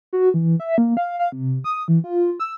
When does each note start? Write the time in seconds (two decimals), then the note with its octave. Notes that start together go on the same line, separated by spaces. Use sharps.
0.13 F#4
0.34 E3
0.60 E5
0.78 A#3
0.97 F5
1.19 F5
1.32 C3
1.64 D#6
1.88 E3
2.04 F4
2.40 E6